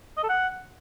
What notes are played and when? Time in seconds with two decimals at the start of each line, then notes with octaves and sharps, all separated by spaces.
0.17 D#5
0.23 A4
0.29 F#5